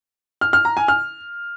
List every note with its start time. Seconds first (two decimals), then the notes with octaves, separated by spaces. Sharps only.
0.41 F6
0.53 F6
0.65 A#5
0.77 G#5
0.88 F6